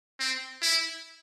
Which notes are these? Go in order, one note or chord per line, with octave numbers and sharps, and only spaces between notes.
C4
E4